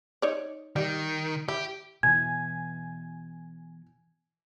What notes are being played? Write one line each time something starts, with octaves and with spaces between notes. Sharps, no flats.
D#4 C#5 D5
D#3 G3 G4
E4 G4
B2 E3 G#5 G#6